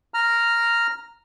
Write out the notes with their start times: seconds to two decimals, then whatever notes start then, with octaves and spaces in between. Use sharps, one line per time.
0.14 A#5 F6